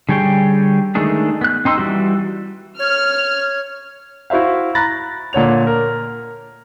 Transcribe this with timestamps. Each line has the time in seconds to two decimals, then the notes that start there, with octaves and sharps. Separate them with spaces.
0.09 D3 G3 G#4 C#5 G5
0.95 D#3 G#3 A3 D4 G#4
1.41 B3 F#6
1.65 C4 D#4 C6 E6
1.78 E3 G3 F#4
2.79 C#5 F6
4.30 E4 F#4 C5 E5 F5
4.75 A#5 B5 F#6 A6 A#6
5.33 A#2 D3 C#5 F7
5.67 A#4